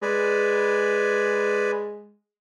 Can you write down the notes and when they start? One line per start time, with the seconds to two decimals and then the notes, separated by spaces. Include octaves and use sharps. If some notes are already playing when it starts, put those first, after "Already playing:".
0.02 G#3 B4 D5 G#5